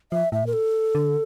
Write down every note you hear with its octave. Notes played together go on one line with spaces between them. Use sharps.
F3 E5
A2 E5
A#2 A#4
A4
D3